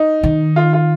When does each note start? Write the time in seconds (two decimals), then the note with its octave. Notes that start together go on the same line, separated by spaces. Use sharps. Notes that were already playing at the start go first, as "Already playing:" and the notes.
Already playing: D#4
0.23 D#3
0.56 F4
0.73 F4